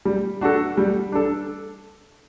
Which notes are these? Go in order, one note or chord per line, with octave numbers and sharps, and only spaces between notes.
G3
D4 F#4 A4
G3
D4 A4